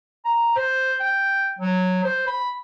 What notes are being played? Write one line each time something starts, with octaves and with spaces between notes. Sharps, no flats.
A#5
C5
G5
F#3
C5
B5